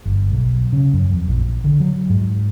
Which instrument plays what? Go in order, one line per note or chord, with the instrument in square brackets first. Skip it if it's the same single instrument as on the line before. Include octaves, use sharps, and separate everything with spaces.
[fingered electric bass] G1
B1
C#3
F#2
F2
A#1
D3
F#3
G#2